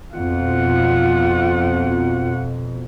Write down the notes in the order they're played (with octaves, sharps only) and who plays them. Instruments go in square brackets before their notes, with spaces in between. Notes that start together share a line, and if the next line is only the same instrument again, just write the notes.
[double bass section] F2 B2 [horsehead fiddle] F4 F#5